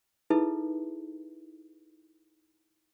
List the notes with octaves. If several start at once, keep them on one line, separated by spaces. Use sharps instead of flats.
D#4 E4 G#4 A4 B4 E5